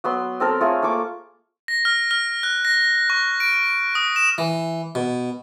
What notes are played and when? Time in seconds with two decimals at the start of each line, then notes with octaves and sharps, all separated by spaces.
0.04 F#3 B3 C6
0.40 C4 A4 A#4
0.60 A3 F4 G#4 C#5
0.82 A#3 A4 C#6 D6
1.68 A#6
1.85 F6
2.11 F6
2.43 F#6
2.65 A#6
3.10 C#6
3.40 D7
3.95 D#6
4.16 E7
4.38 E3
4.95 B2